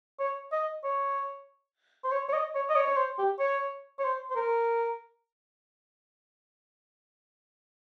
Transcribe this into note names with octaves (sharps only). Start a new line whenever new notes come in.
C#5
D#5
C#5
C5
C#5
C#5
D#5
C#5
D#5
C#5
C#5
C5
G4
C#5
C#5
C5
C5
A#4